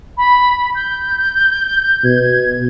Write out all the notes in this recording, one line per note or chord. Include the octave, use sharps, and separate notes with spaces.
B5
G6
B2 G#6